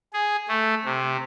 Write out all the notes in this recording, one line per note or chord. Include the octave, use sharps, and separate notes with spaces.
G#4
A3
C3